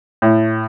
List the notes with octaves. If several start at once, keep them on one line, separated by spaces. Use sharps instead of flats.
A2